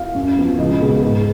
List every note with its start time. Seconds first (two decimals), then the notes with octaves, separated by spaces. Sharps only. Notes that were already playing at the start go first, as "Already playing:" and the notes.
Already playing: F5
0.15 F#2
0.37 F3 B3
0.58 C#2 D#5
0.80 B2 G#3 B3
1.02 G#2